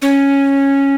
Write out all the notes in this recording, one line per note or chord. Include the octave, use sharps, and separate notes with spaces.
C#4